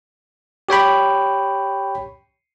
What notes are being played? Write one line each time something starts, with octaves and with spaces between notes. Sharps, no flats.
G4 C#5 G5 B5